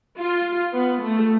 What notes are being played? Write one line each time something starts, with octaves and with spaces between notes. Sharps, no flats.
F4
B3
A3